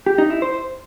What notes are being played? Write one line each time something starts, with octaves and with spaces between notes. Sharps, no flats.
G4
D#4
E4
C5